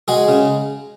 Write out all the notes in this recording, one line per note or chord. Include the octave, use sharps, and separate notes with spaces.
G#3 F#4 G#4
C#3